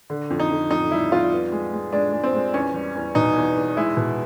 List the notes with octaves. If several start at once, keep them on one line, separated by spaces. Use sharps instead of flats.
D3
F2
D#4
F2
F2 D#4
G3 E4
F2 F4
B3
G#3
G#3
G#3 D4
G#3
C4
G#3
E2 C#4
G3
E2
B2 D#4
E2
E2
G#3 E4
B2